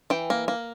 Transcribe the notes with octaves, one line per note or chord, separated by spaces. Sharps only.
E3 G5
A#3
A#3